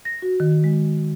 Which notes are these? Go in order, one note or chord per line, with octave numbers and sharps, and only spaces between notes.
A#6
F#4
D#3
G#3